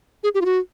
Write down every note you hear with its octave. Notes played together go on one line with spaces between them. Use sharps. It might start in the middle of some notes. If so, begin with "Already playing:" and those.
G#4
G4
F4
F#4